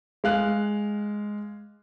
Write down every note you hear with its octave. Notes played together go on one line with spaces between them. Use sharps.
G#3 F5 F#6